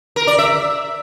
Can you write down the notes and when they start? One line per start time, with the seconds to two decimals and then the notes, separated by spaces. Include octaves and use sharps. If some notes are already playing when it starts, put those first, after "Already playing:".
0.16 A#4
0.27 D5
0.38 E5